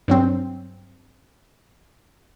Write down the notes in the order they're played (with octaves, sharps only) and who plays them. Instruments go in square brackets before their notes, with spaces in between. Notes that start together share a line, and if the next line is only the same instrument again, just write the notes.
[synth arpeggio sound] G2 F#3 C4